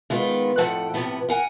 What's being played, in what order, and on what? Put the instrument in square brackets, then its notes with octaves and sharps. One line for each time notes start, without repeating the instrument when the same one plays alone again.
[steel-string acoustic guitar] D#3 G#3 B3 F4
F2 A2 F3 A4 F#5 G5
A2 C3 F3 B3
A#4 F#5 G#5